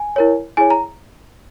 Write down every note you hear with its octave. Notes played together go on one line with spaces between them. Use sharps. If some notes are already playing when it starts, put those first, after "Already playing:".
Already playing: G#5
E4 A#4 C#5
E4 G#4 C#5 G#5
A#5